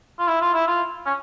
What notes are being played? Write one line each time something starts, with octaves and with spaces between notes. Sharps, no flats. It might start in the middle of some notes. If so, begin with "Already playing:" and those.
F4
E4
F4
E4
F4
C#4